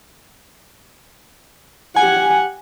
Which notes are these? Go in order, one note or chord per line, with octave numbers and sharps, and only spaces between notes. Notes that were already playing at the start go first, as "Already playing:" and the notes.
G4 F#5 G#5